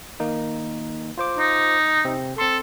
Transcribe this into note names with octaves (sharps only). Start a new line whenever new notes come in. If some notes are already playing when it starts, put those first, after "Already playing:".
D#3 A#3 D#4
F4 C5 D6
D#4
C3 C4
C4 A4 C6